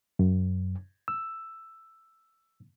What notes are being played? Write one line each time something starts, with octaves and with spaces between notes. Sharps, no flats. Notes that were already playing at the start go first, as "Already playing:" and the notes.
F#2
E6